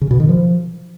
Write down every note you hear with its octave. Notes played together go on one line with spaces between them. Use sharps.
C#3
B2
D#3
F3